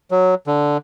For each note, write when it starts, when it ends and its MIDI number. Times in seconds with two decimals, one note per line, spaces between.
0.11 0.35 54
0.47 0.77 50